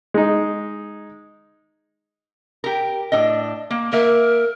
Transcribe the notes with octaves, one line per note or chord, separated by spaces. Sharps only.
G#3 D#4
G4 A#4
A2 D4 D#5
A#3
A#3 A#4 E5